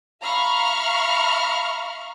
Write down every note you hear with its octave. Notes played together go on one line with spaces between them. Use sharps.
E5 F5 A#5 B5 C#6 F6